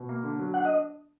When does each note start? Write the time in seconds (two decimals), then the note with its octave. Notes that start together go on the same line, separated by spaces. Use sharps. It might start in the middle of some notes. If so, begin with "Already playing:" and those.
Already playing: B2
0.09 A#3
0.24 D3
0.39 F#3
0.54 D4 F#5
0.65 D#5